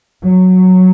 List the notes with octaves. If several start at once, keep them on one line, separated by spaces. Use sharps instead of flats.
F#3